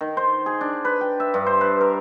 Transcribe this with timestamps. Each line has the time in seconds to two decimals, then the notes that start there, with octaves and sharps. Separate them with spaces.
0.01 D#3
0.17 C5
0.46 G#4
0.61 D4
0.85 B4
1.01 G5
1.20 E5
1.34 G2
1.47 C5
1.61 B4
1.81 A#4